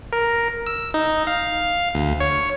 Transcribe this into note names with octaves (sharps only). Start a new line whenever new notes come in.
A#4
E6
D#4
F5
D2
C#5